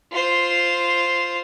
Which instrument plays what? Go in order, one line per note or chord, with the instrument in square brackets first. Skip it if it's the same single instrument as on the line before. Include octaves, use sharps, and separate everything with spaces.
[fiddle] F4 C5